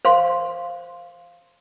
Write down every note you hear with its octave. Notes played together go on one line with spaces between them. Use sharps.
C5 F5 C6